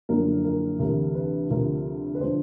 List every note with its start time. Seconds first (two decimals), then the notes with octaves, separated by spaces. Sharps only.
0.09 F#1 F#2 D3 F3 A#4
0.44 A#4
0.79 D2 C3 E3 A#4
1.15 B4
1.50 D2 C3 F3 A#4
2.15 B4
2.21 D3 F3 C5